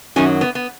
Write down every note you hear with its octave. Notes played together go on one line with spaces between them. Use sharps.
F#2 D#3 F#3 C#4
B3
B3